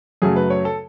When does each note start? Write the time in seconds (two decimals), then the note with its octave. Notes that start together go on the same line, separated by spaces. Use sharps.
0.22 F#2 C#3 F#3 A3 G#4
0.36 B4
0.50 C#5
0.65 A4